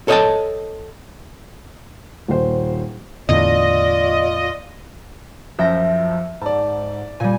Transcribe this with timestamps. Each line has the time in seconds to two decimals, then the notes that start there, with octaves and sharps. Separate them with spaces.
0.08 A4 C#5 D#5 E5 G5 A5
2.28 D#1 C5
3.29 E2 A2 D3 F4 D5 D#5
5.59 F#2 F3 E5 G5 A#6
6.42 G#2 D5 A5
7.20 A#2 G3 G#5